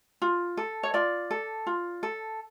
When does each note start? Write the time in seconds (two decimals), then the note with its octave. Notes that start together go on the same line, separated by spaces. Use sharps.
0.22 F4
0.57 A4
0.83 C#5
0.94 F4 D5
1.31 A4
1.67 F4
2.03 A4